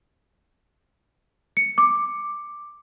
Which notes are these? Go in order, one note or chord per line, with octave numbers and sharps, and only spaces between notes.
C#7
D6